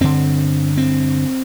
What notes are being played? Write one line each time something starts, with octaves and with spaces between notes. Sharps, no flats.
G2 D3 C4
C4